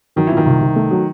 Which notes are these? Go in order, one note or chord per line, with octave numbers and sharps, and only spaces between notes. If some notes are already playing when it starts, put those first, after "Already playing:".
D#3 F#3
A#2 E3
D#3
C2
C2
A3
F#3